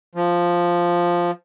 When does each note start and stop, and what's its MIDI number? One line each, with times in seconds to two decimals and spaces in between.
0.15 1.31 53